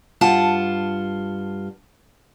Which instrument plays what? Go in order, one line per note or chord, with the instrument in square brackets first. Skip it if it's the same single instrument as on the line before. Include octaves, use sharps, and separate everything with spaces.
[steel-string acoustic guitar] G2 F4 F#5 A5